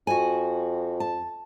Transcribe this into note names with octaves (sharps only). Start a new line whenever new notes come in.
F2 F#4 G#5
A5